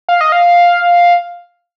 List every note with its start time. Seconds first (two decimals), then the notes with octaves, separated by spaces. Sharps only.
0.09 F5
0.21 D#5
0.32 F5